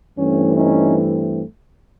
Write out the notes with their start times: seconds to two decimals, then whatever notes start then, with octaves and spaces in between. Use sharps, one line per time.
0.17 G2 E3 A3 C4 C#4
0.56 C#4 D#4